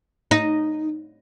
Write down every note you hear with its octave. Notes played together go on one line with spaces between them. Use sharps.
D#4